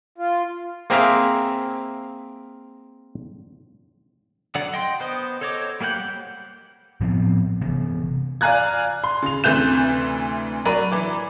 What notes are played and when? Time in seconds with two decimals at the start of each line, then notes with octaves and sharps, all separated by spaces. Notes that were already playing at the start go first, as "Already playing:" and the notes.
0.18 F4
0.90 A#3 C4 G#4 A#4 E5 F5
4.55 D3 F#3 D5 F#5
4.74 D#5 G5 C6
5.00 B3 C5 D#5
5.41 A4 C5 C#5 D#5 D6
5.81 G3 A#3 G4 F#5 G6
7.01 A2 F3 B3 C4
7.62 C3 E3 B3
8.41 D5 F5 G#5 A#5 F#6 G#6
9.04 C6
9.22 C#3 F7
9.44 D2 C3 E3 F#6 G6 E7
10.65 F#3 A#4 D5 B5 D#7
10.92 E3 D6